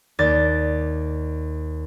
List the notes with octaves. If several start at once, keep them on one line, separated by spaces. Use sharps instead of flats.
D#2 D5 A6 D7